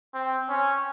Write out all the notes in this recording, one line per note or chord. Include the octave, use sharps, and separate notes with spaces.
C4
C#4